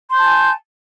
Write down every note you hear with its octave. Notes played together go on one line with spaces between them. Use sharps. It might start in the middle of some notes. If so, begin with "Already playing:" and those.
G#5 A5 C6 G6